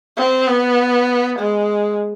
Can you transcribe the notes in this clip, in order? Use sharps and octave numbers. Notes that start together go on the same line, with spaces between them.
C4
B3
G#3